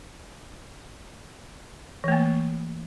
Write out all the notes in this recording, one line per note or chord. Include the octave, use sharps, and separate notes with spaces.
E3 A3 A#3